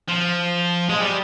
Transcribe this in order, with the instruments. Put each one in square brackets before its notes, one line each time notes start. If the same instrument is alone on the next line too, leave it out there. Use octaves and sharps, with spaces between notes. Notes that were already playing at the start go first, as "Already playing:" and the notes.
[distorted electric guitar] F3
G#3
G3